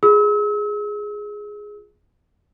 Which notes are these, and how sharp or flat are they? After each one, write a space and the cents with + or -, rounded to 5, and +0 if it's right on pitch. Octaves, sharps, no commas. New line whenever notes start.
F4 +20 G#4 +0 E6 -40